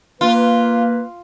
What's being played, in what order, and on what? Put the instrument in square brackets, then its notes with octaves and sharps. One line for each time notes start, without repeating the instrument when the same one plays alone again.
[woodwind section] A#3 B4 [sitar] F4